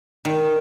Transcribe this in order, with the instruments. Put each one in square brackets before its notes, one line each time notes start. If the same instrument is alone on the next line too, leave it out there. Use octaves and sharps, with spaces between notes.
[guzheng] D#3